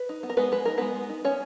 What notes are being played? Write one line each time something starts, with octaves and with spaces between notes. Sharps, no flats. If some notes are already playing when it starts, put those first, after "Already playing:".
Already playing: B4
D#4
B3
A#4
G#3 B3 B4
G#3 B4
D#4 A#4
G#3 B3 B4
G#3
D#4
B3 C#4 C#5